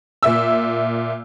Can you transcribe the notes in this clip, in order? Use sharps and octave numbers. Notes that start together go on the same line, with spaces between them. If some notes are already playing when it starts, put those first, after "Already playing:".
A#2 E5 E6